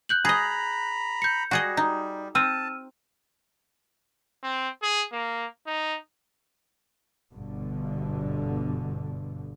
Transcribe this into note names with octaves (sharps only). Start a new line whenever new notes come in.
F#6 G6 F#7
G#4 D#5 A#5 B5
G6 C#7
G3 F#4 G#4 D#5
D#4
C4 A5 E6 F6 D#7
C4
G#4
A#3
D#4
G1 G2 B2 D3